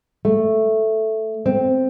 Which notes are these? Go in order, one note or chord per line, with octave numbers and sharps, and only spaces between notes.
A3
C4